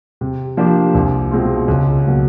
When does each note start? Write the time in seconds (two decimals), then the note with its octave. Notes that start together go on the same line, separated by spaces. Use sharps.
0.21 C3
0.57 F3 A#3 D4 G4
0.94 C2
1.31 B2 G#3 C4 F4
1.68 C#2
2.06 B2 F#3 A#3